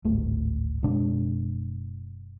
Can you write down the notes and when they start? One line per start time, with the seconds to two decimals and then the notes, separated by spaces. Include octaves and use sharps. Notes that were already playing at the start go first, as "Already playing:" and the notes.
0.05 D1 G#1 A3
0.83 F#1 B2 G#3 D4